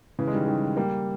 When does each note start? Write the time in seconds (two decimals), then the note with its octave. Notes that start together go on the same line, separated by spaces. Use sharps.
0.19 C#3 E3
0.27 G#3
0.33 D#3 G3
0.48 D#3 G3
0.77 G3 A#3